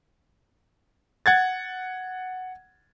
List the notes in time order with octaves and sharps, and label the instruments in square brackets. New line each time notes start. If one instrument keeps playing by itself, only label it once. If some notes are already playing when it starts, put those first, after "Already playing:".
[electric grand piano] F#5 G#6 A6